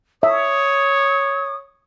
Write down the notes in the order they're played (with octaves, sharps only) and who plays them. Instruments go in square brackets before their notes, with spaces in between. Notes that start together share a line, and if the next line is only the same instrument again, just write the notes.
[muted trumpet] C#5 [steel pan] E5 [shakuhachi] D#6